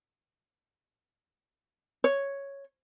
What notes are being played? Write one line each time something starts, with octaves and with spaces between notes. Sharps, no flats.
C#5